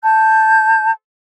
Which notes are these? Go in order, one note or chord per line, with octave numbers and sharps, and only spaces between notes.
A5 G6